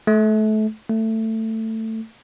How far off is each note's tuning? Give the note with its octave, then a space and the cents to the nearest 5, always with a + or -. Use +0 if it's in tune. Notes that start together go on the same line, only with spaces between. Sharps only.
A3 -30
A3 +15